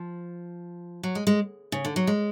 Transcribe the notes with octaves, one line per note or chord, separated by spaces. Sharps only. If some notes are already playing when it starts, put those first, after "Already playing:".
Already playing: F3
F#3
G#3
G#3
C#3
D3
F#3
G#3